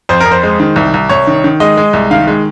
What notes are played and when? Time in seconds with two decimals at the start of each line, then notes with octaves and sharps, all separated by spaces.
0.09 F2 C5
0.20 F2 A#4
0.31 C5
0.43 G#3
0.60 D#3
0.76 C2
0.94 C2
1.09 C2 C#5
1.27 D#3
1.44 D#3
1.60 G#3 D#5
1.77 G#3
1.93 C2
2.11 D#3 F5
2.27 G#3